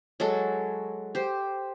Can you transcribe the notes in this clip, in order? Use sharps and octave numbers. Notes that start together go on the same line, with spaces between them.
F#3 G#3 F#4 A4
G4 C5